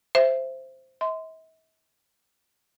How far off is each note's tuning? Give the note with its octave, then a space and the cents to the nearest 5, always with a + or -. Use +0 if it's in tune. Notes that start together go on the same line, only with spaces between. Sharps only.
C5 +0 E5 +15
E5 -45 C6 -20